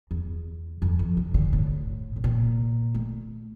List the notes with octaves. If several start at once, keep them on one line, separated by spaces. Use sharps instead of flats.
E2
F2
F2
D3
D3
A2
A2
A#2
A3